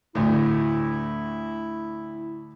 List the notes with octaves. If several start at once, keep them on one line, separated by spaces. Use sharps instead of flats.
D2 A2 E4